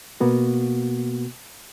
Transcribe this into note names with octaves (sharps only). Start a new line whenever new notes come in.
B2 A#3 B3 F#4